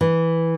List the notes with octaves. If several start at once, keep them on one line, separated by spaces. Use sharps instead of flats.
E3